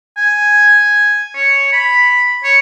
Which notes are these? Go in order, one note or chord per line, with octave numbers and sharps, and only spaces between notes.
G#5
C#5
B5
C#5